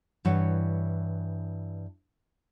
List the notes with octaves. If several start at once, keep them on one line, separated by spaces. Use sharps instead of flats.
G2 E3 C#5 F#5